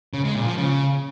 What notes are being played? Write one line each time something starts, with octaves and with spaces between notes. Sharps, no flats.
C#3
G#3
A#2
F3
C#3